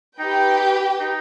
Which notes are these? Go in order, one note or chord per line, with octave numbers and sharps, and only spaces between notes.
D#4 G4 B4 G5
D#4